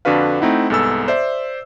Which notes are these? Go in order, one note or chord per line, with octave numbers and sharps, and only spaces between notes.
F2 D3 D4 F#4 B4 F5
A3 C4 D#4 E4 F#5
C2 G#2 B3 A4 G#5 E6
C5 D5 E5